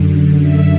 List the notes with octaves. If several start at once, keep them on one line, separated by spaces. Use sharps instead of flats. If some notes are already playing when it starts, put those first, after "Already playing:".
Already playing: F#2 D3
E5